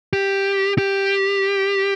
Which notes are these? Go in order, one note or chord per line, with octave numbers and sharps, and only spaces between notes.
G4
G4